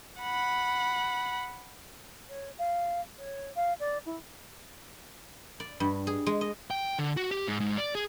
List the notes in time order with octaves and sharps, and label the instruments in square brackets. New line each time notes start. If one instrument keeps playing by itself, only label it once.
[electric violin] F#5 B5
[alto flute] C#5
F5
C#5
F5
D5
E4
[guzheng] D5
G2
G#4
G#3
D#5
[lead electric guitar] G5
D3
F#4
G4
G#2
G#2
D5
G#4